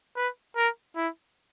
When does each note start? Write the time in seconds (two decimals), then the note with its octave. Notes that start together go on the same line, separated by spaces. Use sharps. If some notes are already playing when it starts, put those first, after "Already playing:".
0.16 B4
0.56 A#4
0.96 E4